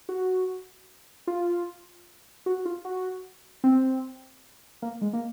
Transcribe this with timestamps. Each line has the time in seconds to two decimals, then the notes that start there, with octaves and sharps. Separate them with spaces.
0.09 F#4
1.27 F4
2.46 F#4
2.65 F4
2.85 F#4
3.64 C4
4.82 A#3
5.01 G#3
5.13 A#3